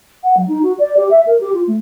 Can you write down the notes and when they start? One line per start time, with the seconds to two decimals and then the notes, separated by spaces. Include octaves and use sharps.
0.24 F#5
0.37 F#3
0.48 D#4
0.63 F#4
0.79 D5
0.97 G4
1.10 E5
1.27 A#4
1.40 G4
1.54 F4
1.67 A3